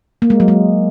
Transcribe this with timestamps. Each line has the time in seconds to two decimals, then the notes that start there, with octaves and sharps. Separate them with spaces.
0.22 A#3
0.30 G#3
0.40 F#3
0.48 G#3